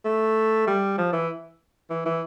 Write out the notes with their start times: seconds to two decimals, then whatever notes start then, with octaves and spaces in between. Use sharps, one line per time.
0.05 A3
0.67 G3
0.98 F3
1.13 E3
1.90 E3
2.05 E3